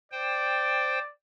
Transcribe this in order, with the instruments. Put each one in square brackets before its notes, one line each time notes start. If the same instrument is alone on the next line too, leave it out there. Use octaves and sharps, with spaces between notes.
[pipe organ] C5 G5 [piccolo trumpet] D5